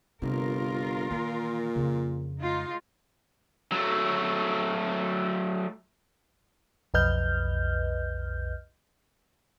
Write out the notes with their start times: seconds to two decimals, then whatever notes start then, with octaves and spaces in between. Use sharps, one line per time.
0.22 G1 C3 F4 A#4
1.10 A#2 D#3 E3
1.76 F2 C#3
2.40 G#3 D#4 F4
3.72 F#3 A3
6.94 B1 F2 B4 D#5 F6 G6